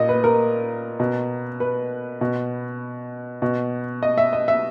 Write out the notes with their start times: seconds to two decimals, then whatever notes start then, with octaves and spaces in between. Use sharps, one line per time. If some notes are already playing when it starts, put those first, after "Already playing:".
Already playing: A#2 D#5
0.09 B4
0.24 A#4
1.00 B2
1.60 B4
2.21 B2
3.42 B2
4.03 D#5
4.18 E5
4.33 D#5
4.48 E5